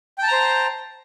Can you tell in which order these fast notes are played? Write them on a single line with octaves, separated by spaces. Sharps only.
G5 A5 A#5 C5